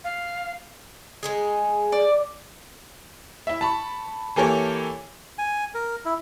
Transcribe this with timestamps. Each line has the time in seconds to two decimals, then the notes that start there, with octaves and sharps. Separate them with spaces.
0.04 F5
1.23 G#3 D#4 G#4
1.92 D5
3.47 E4 E5
3.61 A5 B5 C#6
4.36 E3 A#3 G4 A4 A#4 C#5
5.38 G#5
5.75 A#4
6.05 E4